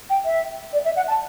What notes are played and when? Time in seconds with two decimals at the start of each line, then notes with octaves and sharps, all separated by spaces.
0.10 G5
0.25 E5
0.73 D5
0.85 E5
0.96 F#5
1.08 A5